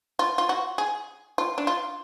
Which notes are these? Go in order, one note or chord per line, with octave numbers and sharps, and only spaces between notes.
F4
F4
F#4
G#4
F4
D4
F4